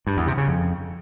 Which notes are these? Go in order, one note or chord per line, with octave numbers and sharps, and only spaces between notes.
G2
E2
C3
C#3
F2